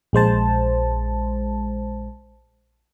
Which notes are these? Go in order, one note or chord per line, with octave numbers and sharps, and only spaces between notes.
A#1 G#3 C5 A5